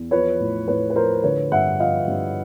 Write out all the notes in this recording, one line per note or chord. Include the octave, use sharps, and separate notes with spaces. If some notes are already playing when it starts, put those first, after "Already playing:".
Already playing: E2
F3 B4 C#5
A2
A2 B4 C#5
B4
F3 A#4 C5
D3 B4 C#5
G2 E5 F#5
F3 D#5 F5
G2